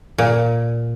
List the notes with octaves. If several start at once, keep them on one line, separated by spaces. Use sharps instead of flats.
A#2